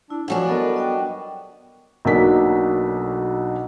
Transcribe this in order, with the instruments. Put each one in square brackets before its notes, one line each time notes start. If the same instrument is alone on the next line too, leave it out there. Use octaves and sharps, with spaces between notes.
[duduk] D4 [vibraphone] E4
[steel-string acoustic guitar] G2 F#3 D4 [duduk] F3 [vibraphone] F#5 G#5
[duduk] B3 [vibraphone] A4 A#4 D#5
[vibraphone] D#5 F#5 G5
[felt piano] B1 B2 F#3 A#3 D4 B6